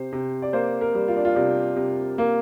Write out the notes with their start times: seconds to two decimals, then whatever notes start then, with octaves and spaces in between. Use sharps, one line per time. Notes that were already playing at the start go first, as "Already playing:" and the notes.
Already playing: C3 C5
0.12 C3
0.42 D5
0.53 A#3 C5
0.81 A#4
0.95 G3
1.08 F4
1.16 D4
1.25 F4
1.35 C3 D4
1.76 C3
2.18 A#3